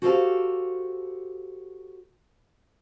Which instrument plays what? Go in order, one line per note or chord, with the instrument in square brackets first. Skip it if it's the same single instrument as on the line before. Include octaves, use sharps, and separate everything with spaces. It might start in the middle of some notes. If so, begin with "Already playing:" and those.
[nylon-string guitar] F#4 G4 A4 C5 E5 F5